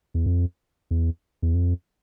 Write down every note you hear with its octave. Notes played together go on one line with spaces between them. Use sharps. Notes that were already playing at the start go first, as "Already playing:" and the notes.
E2
F2
E2
E2
F2